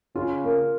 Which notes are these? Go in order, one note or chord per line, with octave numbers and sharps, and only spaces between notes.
C#3 F4
A#3